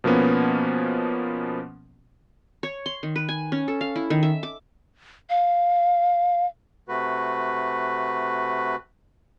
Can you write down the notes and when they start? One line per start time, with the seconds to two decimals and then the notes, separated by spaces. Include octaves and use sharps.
0.04 B2 F3 A#3 B3 C#4
2.63 C#5
2.86 C6
3.03 D#3
3.16 B4
3.29 G#5
3.52 C#4
3.68 A4
3.81 F5
3.96 E4
4.10 D#3
4.23 E5
4.43 D6
5.30 F5
6.89 C3 A3 F#4 B4